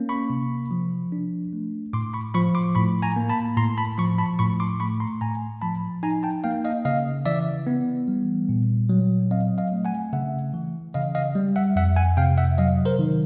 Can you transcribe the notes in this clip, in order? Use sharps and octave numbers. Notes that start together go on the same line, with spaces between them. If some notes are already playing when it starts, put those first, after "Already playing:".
Already playing: A#3 C#4
B5 C#6
C3
F3
D4
A3
A2 C6 D6
B5 C#6
F3 B5 C#6
C6 D6
A2 B5 C#6
G#5 A#5
A#3
A5 B5
A2 A#5 C6
A5 B5
F3 B5 C#6
A5 B5
A2 B5 C#6
C6 D6
A3 B5 C#6
A#5 C6
A2 G#5 A#5
F3 A5 B5
D#4 G#5 A#5
G5 A5
A#3 F5 G5
D#5 F5
C#3 D#5 F5
E3 D5 E5
B3
G3
A#2
F#3
C4 D#5 F5
D#5 F5
A3
F#5 G#5
C#3 E5 F#5
E3
C#3 D#5 F5
D#5 F5
G3
E5 F#5
F2 E5 F#5
F#5 G#5
C3 F5 G5
E5 F#5
F#3 D#5 F5
A#4 C5
D#3